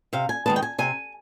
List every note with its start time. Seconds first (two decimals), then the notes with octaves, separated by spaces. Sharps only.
0.13 C3 F5
0.29 G#5
0.46 D#3 G#3 B3 A5
0.56 G5
0.63 G#5
0.78 C3 G#5